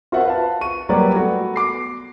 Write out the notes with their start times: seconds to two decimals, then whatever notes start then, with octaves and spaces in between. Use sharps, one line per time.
0.12 F4 F#4 A#4 C5 E5 F#5
0.25 B4 F5 A5
0.61 C#6 D#7
0.89 F#3 G3 A#3 G4 B4 D5
1.15 A3 B3 F#4 A4
1.56 D6 C7